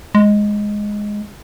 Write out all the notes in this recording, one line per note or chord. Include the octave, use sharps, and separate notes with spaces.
G#3